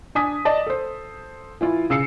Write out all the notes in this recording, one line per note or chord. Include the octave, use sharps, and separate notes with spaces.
D4 G#5 D#6 B6
D5 D#5 A5
A4 C5
E3 E4 F4
C#3 E6 C7 C#7